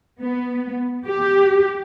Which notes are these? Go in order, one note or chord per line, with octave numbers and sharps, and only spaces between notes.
B3
G4